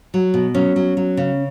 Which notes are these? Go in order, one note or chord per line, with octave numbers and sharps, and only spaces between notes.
F#3
B2
F#3 C#4
F#3
F#3
C#3